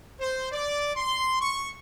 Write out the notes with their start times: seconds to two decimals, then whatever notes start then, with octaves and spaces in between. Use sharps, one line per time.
0.20 C5
0.52 D5
0.96 C6
1.42 C#6